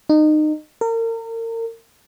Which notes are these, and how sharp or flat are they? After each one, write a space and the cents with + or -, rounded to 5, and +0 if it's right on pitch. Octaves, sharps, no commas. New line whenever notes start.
D#4 -25
A#4 -35